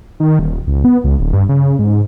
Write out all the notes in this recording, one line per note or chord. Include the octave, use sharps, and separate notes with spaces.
D#3
D#1
C#2
B3
C#2
D1
G2
C#3
G#2